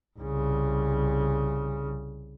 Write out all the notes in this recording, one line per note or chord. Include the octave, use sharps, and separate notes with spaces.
C2 C#3